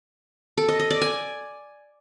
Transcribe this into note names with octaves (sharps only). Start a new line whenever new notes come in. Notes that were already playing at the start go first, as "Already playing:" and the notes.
A4
D#5
D#5
D5
G#5